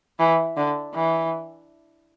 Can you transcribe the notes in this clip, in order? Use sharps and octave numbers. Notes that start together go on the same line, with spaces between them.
E3
D3
E3